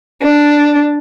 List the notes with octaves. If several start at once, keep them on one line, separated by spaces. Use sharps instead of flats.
D4